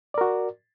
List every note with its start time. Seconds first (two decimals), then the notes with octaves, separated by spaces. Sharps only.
0.14 D5
0.18 A#4
0.21 F#4